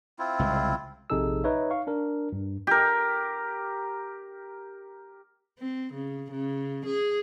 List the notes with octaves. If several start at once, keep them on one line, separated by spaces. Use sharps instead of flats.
C4 E4 F4
C2 C#3 G#3
A#1 C3 D#4 G#4 A4 E6
D#4 B4 C#5 E5
F5 C#6
D4 A#4
G2
G4 A#4
C4
C#3
C#3
G#4